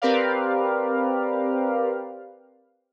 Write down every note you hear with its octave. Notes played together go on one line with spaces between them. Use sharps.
C4 G4 A#4 B4 D5 F5